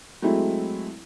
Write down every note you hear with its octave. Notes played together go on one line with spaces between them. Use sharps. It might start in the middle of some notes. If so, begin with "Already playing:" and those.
F#3 G#3 A3 C4 E4